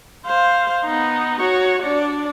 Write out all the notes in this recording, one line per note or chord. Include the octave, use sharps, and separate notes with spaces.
C5 F5
B3 D#4
F#4 C#5
D4 D5